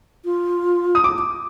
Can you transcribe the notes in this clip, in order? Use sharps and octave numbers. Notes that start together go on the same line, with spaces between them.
F4
D#6
D6